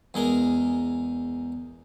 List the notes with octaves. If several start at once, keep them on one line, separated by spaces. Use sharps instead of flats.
E2 G#3 A#4